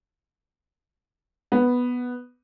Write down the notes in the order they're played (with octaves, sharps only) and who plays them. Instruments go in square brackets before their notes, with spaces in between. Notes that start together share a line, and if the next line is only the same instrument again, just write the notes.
[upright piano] B3